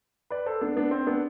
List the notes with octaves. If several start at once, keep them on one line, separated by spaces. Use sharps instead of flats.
B4 D5
A4 C5
B3 D4
B3 D4
C4
B3 D4